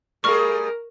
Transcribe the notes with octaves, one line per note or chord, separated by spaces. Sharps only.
G3 A3 G#4 A#4 C#6 F6